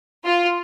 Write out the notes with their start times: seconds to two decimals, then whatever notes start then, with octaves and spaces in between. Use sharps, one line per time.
0.25 F4